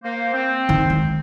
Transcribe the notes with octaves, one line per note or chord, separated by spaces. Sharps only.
A#3 C5
C4
D#3
G#3